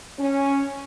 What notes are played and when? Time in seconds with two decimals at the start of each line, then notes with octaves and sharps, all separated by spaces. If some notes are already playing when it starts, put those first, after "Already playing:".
0.19 C#4